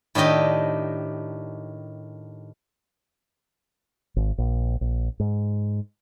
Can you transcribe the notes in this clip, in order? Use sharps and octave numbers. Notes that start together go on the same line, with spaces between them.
A2 D#3 D4 G4 D#5
G#1
A#1
A#1
G#2